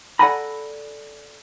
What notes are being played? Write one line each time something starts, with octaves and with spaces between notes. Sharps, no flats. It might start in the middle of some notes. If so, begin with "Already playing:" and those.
A4 D5 F#5 G#5 A#5 B5